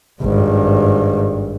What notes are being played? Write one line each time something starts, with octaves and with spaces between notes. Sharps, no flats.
G#1 G2